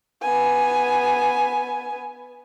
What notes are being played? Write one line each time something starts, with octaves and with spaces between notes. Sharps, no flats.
B3 G#5